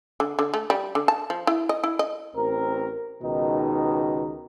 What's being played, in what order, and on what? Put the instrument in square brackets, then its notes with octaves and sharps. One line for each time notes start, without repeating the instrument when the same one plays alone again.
[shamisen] D3
D3
A3
G3
D3
A5
F3
E4
D#5
E4
D#5
[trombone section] A1 C4 A#4
C#2 B2 D#3 D#4